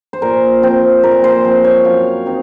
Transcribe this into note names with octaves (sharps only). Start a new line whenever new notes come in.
C5
A#2 A#4
F3 C4 C5
A#2 A#4
C5
F3 C4 C5
C#5
F#2 F5
C4 D#4